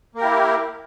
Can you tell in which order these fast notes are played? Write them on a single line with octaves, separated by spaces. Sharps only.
A#3 A#4 G4 E4